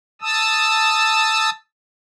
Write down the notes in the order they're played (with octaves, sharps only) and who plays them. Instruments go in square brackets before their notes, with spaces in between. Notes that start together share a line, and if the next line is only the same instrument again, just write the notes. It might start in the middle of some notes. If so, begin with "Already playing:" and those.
[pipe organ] A5 D#6 E6